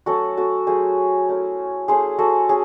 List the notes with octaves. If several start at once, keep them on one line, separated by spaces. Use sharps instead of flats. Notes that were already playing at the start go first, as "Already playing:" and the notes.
F#3 A3 C#4 F#4 A4
F#4 A4
F#3 A3 C#4 G#4 C5
A3 C#4 E4
A3 C#4 E4 G#4 C5
F#4 A4
C#4 G#4